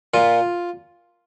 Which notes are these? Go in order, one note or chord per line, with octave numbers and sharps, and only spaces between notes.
A#2 F4